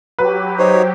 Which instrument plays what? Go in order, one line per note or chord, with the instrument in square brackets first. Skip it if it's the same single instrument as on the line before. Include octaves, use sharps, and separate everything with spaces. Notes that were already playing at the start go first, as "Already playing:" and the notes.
[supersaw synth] F#3 G4 [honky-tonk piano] B4
[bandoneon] D#4 C#5 [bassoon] C5